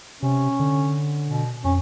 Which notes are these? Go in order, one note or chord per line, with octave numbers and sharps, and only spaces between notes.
C3 C#4
D3
B2
F2 C#4